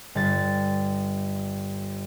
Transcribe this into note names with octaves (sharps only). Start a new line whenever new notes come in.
G1 A6